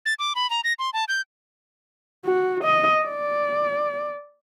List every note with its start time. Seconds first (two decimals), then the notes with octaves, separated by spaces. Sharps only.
0.06 A6
0.19 D6
0.35 B5
0.50 A#5
0.64 A#6
0.79 C6
0.93 A5
1.08 G6
2.26 F#4
2.64 D#5
3.06 D5